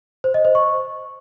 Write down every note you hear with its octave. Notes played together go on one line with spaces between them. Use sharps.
C5
D#5
C5
C#6